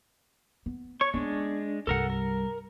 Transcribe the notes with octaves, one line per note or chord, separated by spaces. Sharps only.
B3
C#5 C#6
G#3 B3 C#4 D4
C2 G2 A4 A#4 F#5
A#4